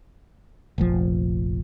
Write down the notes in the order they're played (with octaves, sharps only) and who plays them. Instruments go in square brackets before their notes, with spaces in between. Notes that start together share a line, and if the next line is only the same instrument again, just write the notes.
[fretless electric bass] F1 A#1 F3